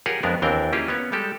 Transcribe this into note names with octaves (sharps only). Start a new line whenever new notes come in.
F4 G4 G#4 A#4 C#5 F#5
F2 G#3 B3 D4 A#4
D#2 E3 C4 D4 A#4 G5
A#3 C#4 E4 F4 G4 G#4
B3 C#4 C#5
G3 G#3 G4 A4